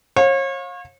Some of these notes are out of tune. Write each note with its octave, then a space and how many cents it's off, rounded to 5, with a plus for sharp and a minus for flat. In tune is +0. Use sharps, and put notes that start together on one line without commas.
C#5 -35 F5 +30